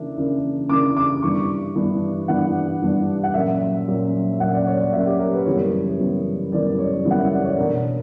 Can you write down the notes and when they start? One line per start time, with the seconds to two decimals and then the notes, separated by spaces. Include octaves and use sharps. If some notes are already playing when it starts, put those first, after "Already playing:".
Already playing: C#3 E3 A#3 D4 E5
0.17 C#3 E3 A#3 D4
0.69 C#3 E3 A#3 D4 D6
0.97 D6
1.23 G2 E3 B3 D4 C#6
1.75 G2 E3 B3 D4
2.28 G2 E3 B3 D4 F#5
2.81 G2 E3 B3 D4
3.24 F#5
3.34 A#2 F#3 C#4 E5
3.88 A#2 F#3 C#4
4.40 A#2 F#3 C#4 F#5
4.54 D5
4.67 C#5
4.79 D5
4.93 A#2 F#3 C#4 E5
5.06 G4
5.19 A#4
5.33 B4
5.46 F#2 C#3 E3 G3 B3 C#5
5.99 F#2 C#3 E3 G3 B3
6.52 F#2 C#3 E3 G3 B3 D5
6.69 D5
6.79 C#5
7.05 F#2 C#3 E3 G3 B3
7.11 F#5
7.18 E5
7.31 D5
7.45 C#5
7.57 B2 A#3 D4 A#4